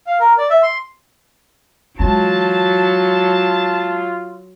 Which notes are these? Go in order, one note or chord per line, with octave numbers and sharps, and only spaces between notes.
F5
A#4
D5
E5
C6
E3 F#3 G#3 F4 A5